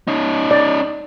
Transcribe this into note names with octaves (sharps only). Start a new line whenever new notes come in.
C#4 D#4
D5